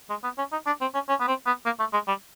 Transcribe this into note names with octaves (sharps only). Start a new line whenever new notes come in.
G#3
B3
C#4
D#4
D4
C4
C#4
C#4
B3
C4
B3
A#3
A3
G#3
G3